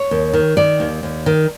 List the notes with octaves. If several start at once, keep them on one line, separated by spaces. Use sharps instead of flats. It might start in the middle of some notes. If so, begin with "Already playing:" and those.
Already playing: C#5
D#2
D#3
D#3 D5
D#2
D#2
D#3